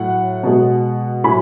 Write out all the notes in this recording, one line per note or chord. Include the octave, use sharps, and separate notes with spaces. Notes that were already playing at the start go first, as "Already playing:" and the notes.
Already playing: A2 F#3 F#5
B2 G#3
A2 F#3 G#5 B5